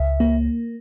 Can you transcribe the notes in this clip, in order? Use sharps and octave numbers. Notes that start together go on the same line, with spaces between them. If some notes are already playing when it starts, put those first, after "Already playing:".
Already playing: C#2 E5
A#3